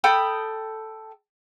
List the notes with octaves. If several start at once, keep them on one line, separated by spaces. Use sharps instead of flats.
A4 G5 B5 D#6